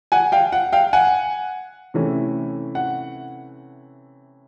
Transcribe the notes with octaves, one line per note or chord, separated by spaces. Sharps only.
F#5 G#5
F5 G5
F#5
F5 G5
F#5 G#5
C3 E3 A3 C#4
F#5